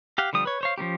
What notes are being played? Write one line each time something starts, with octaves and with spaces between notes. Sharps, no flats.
G4 F5 F#5
D3 F3 G3 D#6
B4 C#5
C5 C#5 F5
F3 B3 C#4 G4